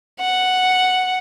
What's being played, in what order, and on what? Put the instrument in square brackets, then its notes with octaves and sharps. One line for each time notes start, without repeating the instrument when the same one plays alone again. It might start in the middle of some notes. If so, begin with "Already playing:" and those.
[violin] F#5